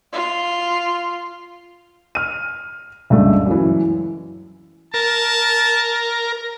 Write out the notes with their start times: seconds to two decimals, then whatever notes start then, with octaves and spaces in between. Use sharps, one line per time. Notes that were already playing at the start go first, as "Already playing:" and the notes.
0.13 F4
2.15 F6 D#7
3.10 C#2 G2 A3 D5
3.46 F#2 E3
4.94 A#4 A5